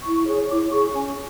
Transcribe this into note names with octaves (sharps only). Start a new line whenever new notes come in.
E4 C#6
G#4 C#5
E4 D6
G#4 C#5 C#6
C#4 G#5